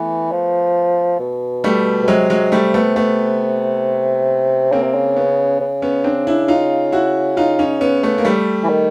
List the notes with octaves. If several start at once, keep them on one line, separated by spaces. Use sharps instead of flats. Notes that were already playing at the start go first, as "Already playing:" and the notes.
Already playing: E3 A3 B3
F3
B2
G3 A3
B2
C3 F#3 G#3
F#3 G#3
G3 A3
A3 B3
A3 B3
C#3 A#3 C4
C3
C#3
B3 C#4
C#3
B3 C#4
C4 D4
D4 E4
D#4 F4
E4 F#4
D#4 F4
C#4 D#4
B3 C#4
A3 B3
A#3
G3 A3
E3
D#3